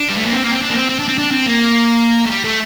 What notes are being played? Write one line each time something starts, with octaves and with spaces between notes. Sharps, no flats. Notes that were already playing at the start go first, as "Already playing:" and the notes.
Already playing: D4
G3
A3
A#3
C4
A#3
C4
D4
A#3
C4
C4
D4
C4
D4
C4
A#3
A3
G3
A3